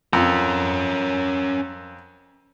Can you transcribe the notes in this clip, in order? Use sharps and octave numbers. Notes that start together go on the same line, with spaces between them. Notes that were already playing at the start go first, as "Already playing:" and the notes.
F2 C#4 A#4